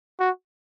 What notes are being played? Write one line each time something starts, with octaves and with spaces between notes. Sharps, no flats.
F#4